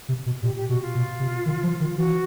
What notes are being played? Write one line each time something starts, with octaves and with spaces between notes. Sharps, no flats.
C3
B2
A#2 G4
G4
B2 F#4
F4
B2
C3
D#3
F3
D#3
E3 F#4